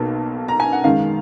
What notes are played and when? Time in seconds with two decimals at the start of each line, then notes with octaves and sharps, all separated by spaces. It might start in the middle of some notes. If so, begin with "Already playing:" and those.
Already playing: B1 B2 A#3
0.48 A#5
0.60 G#5
0.73 F#5
0.84 F#2 D#3 G#3 F5